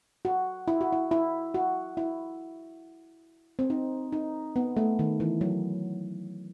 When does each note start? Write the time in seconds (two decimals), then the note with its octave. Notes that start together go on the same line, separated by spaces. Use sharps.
0.25 F#4
0.68 E4
0.81 F#4
0.92 E4
1.11 E4
1.54 F#4
1.97 E4
3.59 C4
3.70 D#4
4.12 D#4
4.56 B3
4.77 A3
4.99 D#3
5.20 E3
5.41 F#3